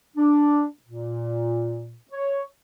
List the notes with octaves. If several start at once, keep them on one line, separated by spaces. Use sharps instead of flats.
D4
A#2
C#5